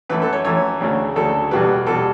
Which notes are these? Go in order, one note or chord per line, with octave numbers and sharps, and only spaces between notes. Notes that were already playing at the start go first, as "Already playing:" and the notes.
F#2 E3 A3 B4
A4
C#5
F#2 E3 A3 C#5
D2 C#3 F#3 A3
D2 C#3 F#3 A3 A4
E2 B2 G3 B4
E2 B2 G3 A4